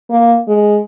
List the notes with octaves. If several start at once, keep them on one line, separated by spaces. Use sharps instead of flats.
A#3
G#3